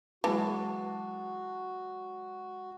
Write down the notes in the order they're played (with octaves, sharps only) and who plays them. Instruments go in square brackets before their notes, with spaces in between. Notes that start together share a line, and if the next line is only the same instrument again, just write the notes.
[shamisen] E3 [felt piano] F#3 G#3 A5 [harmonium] F#4